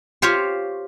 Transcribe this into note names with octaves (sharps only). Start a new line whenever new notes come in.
F4 G4 C5 C#5 F5